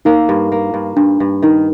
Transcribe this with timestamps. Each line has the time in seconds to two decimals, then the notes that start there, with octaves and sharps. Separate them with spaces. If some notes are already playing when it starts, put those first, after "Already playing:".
0.05 A#3 D#4
0.29 G2
0.52 A#3
0.74 G2
0.97 G2 D4
1.20 G2
1.42 D#3 D#4